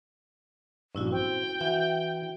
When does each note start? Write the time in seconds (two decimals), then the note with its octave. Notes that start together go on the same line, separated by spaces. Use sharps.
0.95 A#1 G2 C#4 E4 F#4
1.12 C4 G5
1.61 E3 F#4 E5 F#5